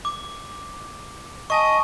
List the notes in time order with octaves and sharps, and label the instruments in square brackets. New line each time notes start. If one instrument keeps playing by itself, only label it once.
[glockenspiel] D6
[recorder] D#5 [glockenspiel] G#5 A5 C#6